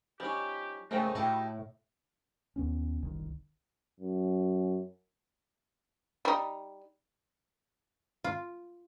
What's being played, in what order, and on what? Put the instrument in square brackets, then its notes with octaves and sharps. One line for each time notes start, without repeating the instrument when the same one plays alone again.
[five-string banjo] F3 D#4 [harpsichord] G3 C#4 [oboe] G4
[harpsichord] G#2 C#3 [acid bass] A3 [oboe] D#4 [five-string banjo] A#4 C5 G5
[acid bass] A2 [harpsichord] E4 A4 D6 [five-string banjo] F#4 G4
[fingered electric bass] D#2 B3 C#4
F#1 C2 D3 D#3
[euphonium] F#2
[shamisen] G3 D#4
[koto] F4